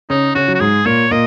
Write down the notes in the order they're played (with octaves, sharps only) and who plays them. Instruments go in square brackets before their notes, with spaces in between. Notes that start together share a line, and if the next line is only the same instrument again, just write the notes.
[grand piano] C#3 C#4 [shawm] D#4
[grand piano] C#3 C#4 [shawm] F#4
[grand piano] F#3
[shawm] F#4
[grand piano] G#2 G#3 [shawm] G#4
[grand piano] A#2 A#3 [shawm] C#5
[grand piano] A#2 A#3 [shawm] D#5